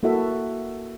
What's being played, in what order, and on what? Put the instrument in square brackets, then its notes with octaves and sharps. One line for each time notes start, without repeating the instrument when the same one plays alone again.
[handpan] A#3 E4 F#4 A4 E5